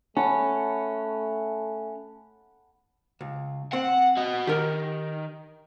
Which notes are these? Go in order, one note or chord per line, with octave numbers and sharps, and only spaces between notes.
A3 C#4 F#5 A5 B5
C#2
C4 F#5
F#4 D#5
D#3 G4 A#4